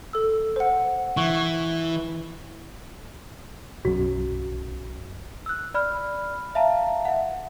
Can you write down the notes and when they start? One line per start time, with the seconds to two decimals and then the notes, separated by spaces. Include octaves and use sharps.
0.13 A4 E6
0.56 C5 F#5
1.17 E3 C#6
3.85 B1 F#2 F#4
5.46 E6 F#6
5.74 D5 B5 F6
6.55 E5 F5 A5 A#5
7.05 E5 F#5